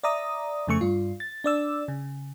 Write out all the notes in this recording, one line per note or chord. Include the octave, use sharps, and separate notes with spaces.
D5 E5 A#5 D#6
F2 C#3 A3 C#6
G2 F4
A6
D4 D5 E6
C#3